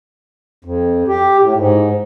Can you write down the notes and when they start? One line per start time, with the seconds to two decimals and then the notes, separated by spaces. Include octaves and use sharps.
0.65 F2
1.08 G4
1.41 A2
1.56 G#2